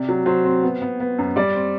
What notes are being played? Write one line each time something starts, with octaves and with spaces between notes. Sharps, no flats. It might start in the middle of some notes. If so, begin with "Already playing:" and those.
Already playing: C3 D5
F#3
F#3 C5
C4
B3
B3
B3
F#2
G3 D5
C4